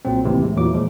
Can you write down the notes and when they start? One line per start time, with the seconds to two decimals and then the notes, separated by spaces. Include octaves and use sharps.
0.05 B1 A#2 F#3 C4
0.24 D#2 A2 C3 E3
0.42 D2 G#3
0.56 E2 A#2 E3 F#3 D6
0.74 A#2 F3 G#3